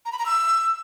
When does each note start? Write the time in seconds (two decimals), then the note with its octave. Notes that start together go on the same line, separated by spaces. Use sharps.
0.05 A#5
0.12 B5
0.19 A#5
0.26 E6